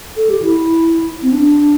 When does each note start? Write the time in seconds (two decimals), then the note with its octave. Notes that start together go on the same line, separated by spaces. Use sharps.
0.17 A4
0.30 G4
0.42 E4
1.23 C4
1.33 D4